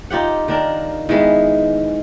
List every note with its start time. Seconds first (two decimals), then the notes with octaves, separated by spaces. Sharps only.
0.10 D#4 F4 G4 F#5
0.48 D#3 D4 A#4
1.09 D#3 E3 G#3 B3